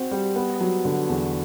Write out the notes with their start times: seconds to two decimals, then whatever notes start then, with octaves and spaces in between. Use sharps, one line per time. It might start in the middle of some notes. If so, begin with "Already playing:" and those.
Already playing: C4 F#4
0.11 G3
0.36 B3
0.61 F#3
0.85 D3
1.09 E2